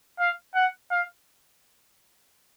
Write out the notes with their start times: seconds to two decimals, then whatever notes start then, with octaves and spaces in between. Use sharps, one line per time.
0.19 F5
0.55 F#5
0.91 F5